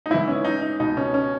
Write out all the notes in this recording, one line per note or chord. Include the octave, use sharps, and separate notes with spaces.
D#4
G#2 E3 E4
C#4
D#4
D#4
C#2 B2 D#4
C#4
C#4